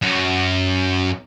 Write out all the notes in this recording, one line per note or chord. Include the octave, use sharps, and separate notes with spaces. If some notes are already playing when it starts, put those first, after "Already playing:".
F#2 F#4